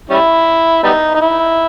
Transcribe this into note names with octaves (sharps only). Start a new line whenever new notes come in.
G3 C#4 E4
G3 B3 D#4
D#4
E4